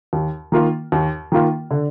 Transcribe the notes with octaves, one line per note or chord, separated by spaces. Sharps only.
D#2
D#3 A#3 F4
D#2
D#3 A#3 F4
D3